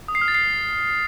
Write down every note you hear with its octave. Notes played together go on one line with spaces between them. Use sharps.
D#6
C7
F6
A6
C7